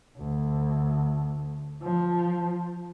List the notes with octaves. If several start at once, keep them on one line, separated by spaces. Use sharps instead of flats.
D2
F3